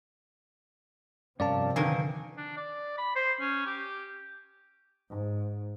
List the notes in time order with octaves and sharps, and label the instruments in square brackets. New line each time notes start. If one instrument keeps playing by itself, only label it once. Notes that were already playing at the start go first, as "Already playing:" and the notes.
[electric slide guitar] G2 C#4 A#4 [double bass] C3 F3 [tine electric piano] D5 F5 A5
[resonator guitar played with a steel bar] D3 D#3 A#4 [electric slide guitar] B4 F5 [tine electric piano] G#5
[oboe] D4
D5
B5
C5
C#4
G4
[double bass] G#2